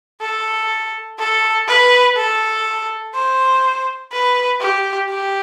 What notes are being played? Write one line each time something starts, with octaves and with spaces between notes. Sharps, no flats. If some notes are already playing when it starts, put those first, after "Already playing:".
A4
A4
B4
A4
C5
B4
G4
G4